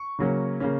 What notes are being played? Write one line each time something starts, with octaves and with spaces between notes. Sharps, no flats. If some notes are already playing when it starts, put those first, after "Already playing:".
Already playing: C#6
C#3 F#3 A#3 C#4
C#3 A#3 C#4